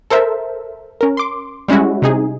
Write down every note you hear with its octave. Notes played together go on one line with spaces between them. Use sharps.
A4 A#4 C5 E5
C#4 A#4
C6 D6
G3 G#3 C#4 E4 F#4
C3 D#4 G#4